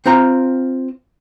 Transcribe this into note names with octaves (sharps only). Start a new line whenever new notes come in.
C4 F4 A#5